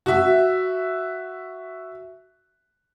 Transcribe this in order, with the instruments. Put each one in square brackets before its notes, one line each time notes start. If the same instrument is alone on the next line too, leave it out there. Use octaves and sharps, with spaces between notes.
[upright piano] F#4 E5